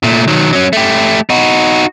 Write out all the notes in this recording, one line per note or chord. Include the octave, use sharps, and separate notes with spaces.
A#2 A3
D#3 F#3
F#3 C#4
A3 G4
D#4 F#4